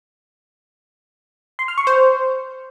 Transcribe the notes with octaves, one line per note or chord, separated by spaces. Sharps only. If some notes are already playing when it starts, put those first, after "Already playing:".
C6
F6
C#6
C5